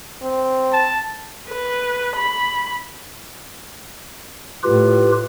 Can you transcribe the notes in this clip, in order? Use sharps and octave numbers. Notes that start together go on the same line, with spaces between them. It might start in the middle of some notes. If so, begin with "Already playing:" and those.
C4
A5
B4
B5
A2 F4 G4 B4